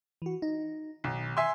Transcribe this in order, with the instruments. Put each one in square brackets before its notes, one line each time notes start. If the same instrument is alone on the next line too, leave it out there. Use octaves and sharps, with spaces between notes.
[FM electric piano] E3 F#4
D#4
[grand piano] B1 [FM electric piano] D#3
[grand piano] E5 G#5 C6